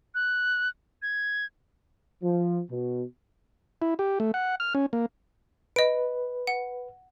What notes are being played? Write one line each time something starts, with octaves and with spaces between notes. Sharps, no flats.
F#6
G#6
F3
B2
E4
G4
A3
F#5
F6
C#4
A#3
B4 D#5 D7
F#5